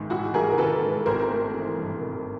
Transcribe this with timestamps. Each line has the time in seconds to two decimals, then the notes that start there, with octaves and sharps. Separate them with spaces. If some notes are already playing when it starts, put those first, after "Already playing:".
Already playing: A1 G#2 D#3
0.10 A1 E4 F#4
0.34 G3 G#4 A#4
0.52 A#4
0.58 D#3 A4 B4
0.82 G#2
1.06 G#1 A#4 C5
1.30 A3
1.54 E3
1.77 G2
2.01 G#1